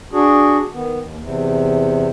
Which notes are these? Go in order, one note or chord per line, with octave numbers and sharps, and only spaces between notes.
D4 F#4 G#4
D#3 B3
D#2
E2 C3